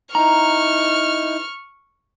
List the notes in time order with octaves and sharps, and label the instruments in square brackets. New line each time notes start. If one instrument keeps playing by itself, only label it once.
[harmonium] D#4 E4 [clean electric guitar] A#5 [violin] C#6 F6